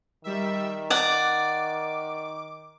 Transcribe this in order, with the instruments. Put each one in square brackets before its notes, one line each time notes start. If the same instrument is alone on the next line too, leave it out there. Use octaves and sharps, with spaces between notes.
[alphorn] D#3 [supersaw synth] G3 E5
[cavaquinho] D5 F#5 [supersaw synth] D6